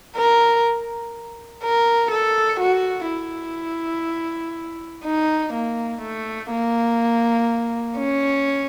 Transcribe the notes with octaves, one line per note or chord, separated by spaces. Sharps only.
A#4
A#4
A4
F#4
E4
D#4
A#3
A3
A#3
C#4